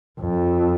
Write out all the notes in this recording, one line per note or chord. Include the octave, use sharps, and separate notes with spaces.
F2